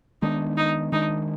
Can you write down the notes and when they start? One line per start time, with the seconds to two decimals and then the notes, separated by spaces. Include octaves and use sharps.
0.22 D#3 G#3 B3 D4 D#4
0.57 D#4
0.92 D#3 G#3 D4 D#4